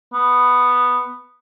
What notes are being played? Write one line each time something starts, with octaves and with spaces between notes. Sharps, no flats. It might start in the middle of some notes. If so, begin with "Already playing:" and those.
B3